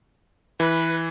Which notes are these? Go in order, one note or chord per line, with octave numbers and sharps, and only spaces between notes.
E3 B4